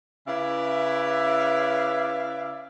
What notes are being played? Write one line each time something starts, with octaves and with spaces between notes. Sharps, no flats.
C#3 E4 B4 D5 E5 F5